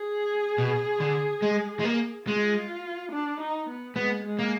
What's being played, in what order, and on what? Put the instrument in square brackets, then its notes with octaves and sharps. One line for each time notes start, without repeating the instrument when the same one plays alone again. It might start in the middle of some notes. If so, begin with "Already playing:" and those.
Already playing: [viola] G#4
[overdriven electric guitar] B2
D3
G#3
G#3
A#3
[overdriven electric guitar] G#3 [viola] F4
[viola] D4
D#4
B3
[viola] G#3 [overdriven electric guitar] B3
[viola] G#3
[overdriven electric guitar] A#3